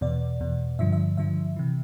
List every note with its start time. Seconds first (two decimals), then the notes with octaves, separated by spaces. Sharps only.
0.01 E2 B2 D5
0.40 E2 B2
0.79 G2 D3 F3 E5
0.92 E5
1.17 G2 D3 F3 E5
1.56 C3 E3